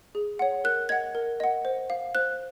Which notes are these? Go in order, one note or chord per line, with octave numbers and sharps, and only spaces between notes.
G#4
C#5 F#5
A#4 F#6
D#5 F#5 G#6
A#4
D#5 F#5
C5
F5
C5 F#6